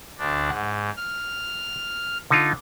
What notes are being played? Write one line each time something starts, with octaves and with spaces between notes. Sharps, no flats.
D2 D4
G#2 F#5
F6
D3 D#4 F4